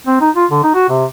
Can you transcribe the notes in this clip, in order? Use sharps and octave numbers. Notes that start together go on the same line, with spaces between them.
C4
D#4
F4
D3
D#4
F#4
C3